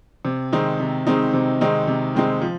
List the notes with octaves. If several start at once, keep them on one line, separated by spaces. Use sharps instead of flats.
C3
D#3 G#3 C4 D#4
C3
D#3 G#3 C4 D#4
C3
D#3 G#3 C4 D#4
C3
D#3 G#3 C4 D#4
F3